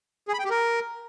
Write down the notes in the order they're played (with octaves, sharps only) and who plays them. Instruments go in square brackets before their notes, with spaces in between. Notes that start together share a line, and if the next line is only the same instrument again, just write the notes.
[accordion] G#4
B5
G5
G4
A#4